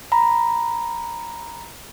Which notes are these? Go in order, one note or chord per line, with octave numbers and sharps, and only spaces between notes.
A#5 B5